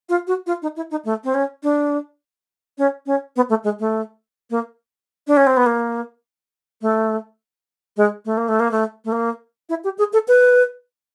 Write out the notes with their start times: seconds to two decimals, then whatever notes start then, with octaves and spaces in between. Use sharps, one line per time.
0.09 F4
0.27 F#4
0.47 F4
0.62 D#4
0.76 E4
0.91 D#4
1.05 A3
1.24 C4
1.34 C#4
1.63 D4
2.78 C#4
3.06 C#4
3.36 B3
3.49 A3
3.64 G#3
3.79 A3
4.50 A#3
5.27 D4
5.37 C#4
5.47 C4
5.57 B3
5.66 A#3
6.82 A3
7.97 G#3
8.25 A3
8.37 A#3
8.48 A3
8.60 A#3
8.71 A3
9.05 A3
9.12 A#3
9.69 E4
9.84 G4
9.98 G#4
10.13 A4
10.28 B4